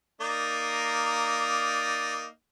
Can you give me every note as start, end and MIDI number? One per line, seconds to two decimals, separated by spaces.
0.21 2.26 58
0.21 2.26 63
0.21 2.26 74